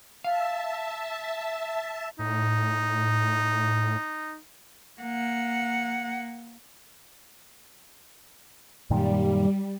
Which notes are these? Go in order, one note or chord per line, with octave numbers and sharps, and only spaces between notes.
E5 F5 A5
A2 D#4
A#3 F#5
F#2 A#2 D#3 G3